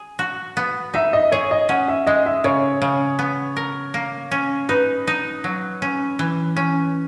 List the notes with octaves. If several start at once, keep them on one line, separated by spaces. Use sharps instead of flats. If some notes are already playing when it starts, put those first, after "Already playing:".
Already playing: G#4
F#4
B3
D#4 E5
D#5
G#4 C#5
D#5
C#4 F#5
E5
G#3 D#5
E5
C#3 C#5
C#3
B3
A#4
A#3
C#4
D#4 B4
D#4
F#3
C#4
E3
C#4